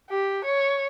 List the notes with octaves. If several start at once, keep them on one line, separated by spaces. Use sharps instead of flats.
G4
C#5